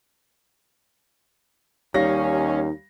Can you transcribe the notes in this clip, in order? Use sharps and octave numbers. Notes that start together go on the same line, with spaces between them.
D#2 G3 C#4 D#4 F5 A#6